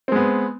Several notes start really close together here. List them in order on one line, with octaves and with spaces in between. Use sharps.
C4 G#3 B3